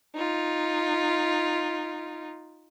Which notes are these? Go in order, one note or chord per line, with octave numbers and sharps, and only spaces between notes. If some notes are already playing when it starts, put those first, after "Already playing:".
D#4 F4